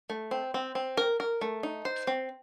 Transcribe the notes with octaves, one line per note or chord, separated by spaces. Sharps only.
A3
C4
C4
C4
A#4
A#4
A3
D#4
C5
C4